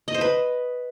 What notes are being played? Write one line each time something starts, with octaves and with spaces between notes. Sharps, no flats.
D#5
C5
B4